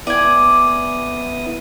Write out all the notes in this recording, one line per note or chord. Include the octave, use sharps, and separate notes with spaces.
B3 E4 D5 G#5 D#6